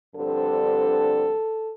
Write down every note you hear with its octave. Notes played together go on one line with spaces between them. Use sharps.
G2 D3 F3 C4 A4